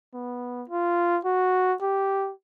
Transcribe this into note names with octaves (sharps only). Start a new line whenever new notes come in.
B3
F4
F#4
G4